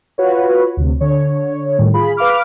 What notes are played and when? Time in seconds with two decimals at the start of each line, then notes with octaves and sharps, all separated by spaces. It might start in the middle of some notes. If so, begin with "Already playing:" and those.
0.18 F4 F#4 B4 C#5
0.77 D2 C3
1.01 D3 C#5
1.78 A2 D#3 G3
1.94 F4 G#4 B5
2.17 B4 F5 B5 D6 F6